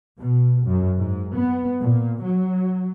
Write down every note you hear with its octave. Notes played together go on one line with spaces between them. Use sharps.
B2
F#2
G#2
B3
A#2
F#3